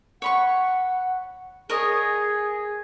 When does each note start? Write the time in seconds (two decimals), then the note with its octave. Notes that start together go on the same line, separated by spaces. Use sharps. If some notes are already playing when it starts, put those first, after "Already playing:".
0.22 C#5 F#5 B5 C#6
1.69 G#4 A#4 C#5 D#5